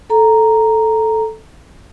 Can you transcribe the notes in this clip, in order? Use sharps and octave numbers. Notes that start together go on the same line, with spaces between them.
A4 A#5